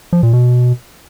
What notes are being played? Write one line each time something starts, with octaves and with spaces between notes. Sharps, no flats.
F3
A#2
B2